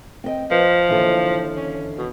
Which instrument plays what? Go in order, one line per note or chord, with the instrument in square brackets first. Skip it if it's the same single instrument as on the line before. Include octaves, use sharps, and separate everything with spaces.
[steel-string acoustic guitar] C4 D#5 G5
[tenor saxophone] F3 [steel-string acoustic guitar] B4
[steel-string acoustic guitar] D#2 D3 E3
[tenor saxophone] C#4
B2